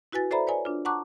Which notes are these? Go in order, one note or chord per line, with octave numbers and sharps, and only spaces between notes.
E4 F#4 B4 G#5 A6
A4 C5 D5 E5 A#5 B5
B4 C#5 D5 G#5
D4 F4
F#5 A5 A#5 C#6 D6 F#6